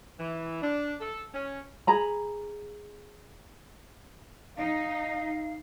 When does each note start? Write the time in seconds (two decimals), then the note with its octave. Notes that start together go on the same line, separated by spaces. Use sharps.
0.19 E3
0.62 D4
1.00 A4
1.34 C#4
1.87 G#4 A#5 B5
4.57 D#4 F5